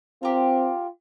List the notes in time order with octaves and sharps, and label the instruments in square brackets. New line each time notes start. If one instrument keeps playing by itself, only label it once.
[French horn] C4 [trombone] F4 [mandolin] G4 A#4